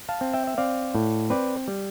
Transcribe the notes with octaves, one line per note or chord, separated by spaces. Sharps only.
F5 A5
C4
E5 G5
E5
C4 D5 F5
A2
C4 B4 D5
G3